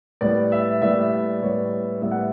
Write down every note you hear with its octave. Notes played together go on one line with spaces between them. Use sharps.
A2 G3 B3 D5
E5
A2 G3 B3 E5
A2 G3 B3 C#5
A2 G3 B3 E5
F#5